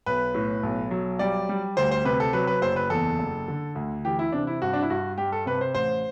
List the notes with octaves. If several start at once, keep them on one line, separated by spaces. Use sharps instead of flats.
B1 B4
A2
B1
F#3
G3 D5
G3
D2 C5
C5
C3 B4
A4
F#3 B4
B4
F#1 C5
B4
E2 A4
F#1
D3
D2
E3 G4
E4
C3 D4
E4
G2 F#4
D4
E4
G2 F#4
G3 G4
A4
C3 B4
C5
A1 C5